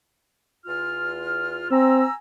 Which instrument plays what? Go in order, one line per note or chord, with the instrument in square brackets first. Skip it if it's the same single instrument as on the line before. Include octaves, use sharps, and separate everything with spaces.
[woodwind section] E2 F4 F6
[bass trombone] C4 [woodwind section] G#5 A#5 E6